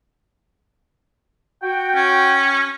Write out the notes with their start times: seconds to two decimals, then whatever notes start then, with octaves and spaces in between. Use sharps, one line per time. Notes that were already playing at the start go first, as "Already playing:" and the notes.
1.62 F#4 G5
1.95 C#4